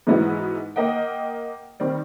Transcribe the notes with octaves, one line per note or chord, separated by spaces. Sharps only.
G#2 E3 G#3 B3 E4 F#4
A#3 A#4 D#5 F#5 G5
D#3 G3 C4